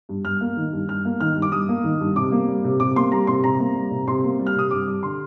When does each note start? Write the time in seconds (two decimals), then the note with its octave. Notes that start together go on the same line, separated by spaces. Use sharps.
0.09 G2
0.25 G2 F6
0.41 A#3
0.57 D#3
0.72 G2
0.89 G2 F6
1.05 A#3
1.20 D#3 F6
1.36 G2
1.42 D6
1.52 G2 D#6
1.69 A#3
1.84 D#3
2.00 G2
2.16 C3 D6
2.32 A#3
2.48 G3
2.64 C3
2.80 C3 D6
2.96 A#3 C6
3.12 G3 A#5
3.27 C3 C6
3.44 C3 A#5
3.60 A#3
3.75 G3
3.91 C3
4.07 C3 C6
4.24 A#3
4.39 G3
4.47 F6
4.55 C3 D#6
4.71 G2 D6
4.87 G3
5.03 D3 C6